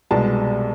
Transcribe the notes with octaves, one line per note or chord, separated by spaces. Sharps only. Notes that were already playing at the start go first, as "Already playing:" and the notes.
C2 B2 G#3 A5